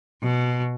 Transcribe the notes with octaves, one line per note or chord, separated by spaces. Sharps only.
B2